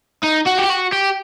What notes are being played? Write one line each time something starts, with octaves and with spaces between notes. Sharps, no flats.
D#4
F#4
G4
F#4
G4